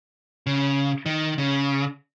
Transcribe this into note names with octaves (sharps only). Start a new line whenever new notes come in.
C#3
D#3
C#3